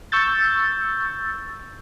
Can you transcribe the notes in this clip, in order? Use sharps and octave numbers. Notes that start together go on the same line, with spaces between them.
C#6 E6 G6 A6